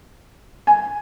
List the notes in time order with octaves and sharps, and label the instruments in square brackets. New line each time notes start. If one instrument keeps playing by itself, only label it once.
[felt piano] G#5